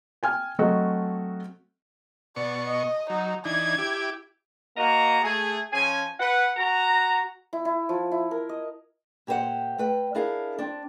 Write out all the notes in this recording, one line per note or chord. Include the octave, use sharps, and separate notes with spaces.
G5 G#5 F6
F#3 A3 C4 F#4 A4 D#5
B2 D5 C#6
D#5
F#3 D#4
E3 D4 D#4 G#6
E4 G4 D6
A#3 F#4 D#5 A#5
A3 G#4
F3 C#4 G#5
B4 F#5
F#4 A#5
E4
E4
F3
E4
A#4
D#5
A#2 G4 B4 C5 F#5
A3 B4 G5
D4 E4 G#4 A#4 F5
C4 D4